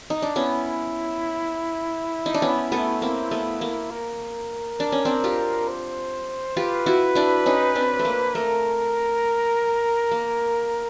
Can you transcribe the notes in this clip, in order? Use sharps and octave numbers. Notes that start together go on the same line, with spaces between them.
D#4
D4
B3 C#4 E4
D#4
D4
B3 C#4
A3 B3
A#3 C4
A3 B3
A#3
A#4
D4
C#4
C4 D4
F4 G4
C5
F4 G4 B4
E4 F#4
D4 E4
C#4 D#4
C4 D4
A3
A#3
A3 A#4
A#3